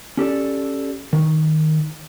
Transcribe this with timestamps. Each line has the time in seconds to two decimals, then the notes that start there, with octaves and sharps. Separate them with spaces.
0.17 C#4 G4 A4 D5
1.13 D#3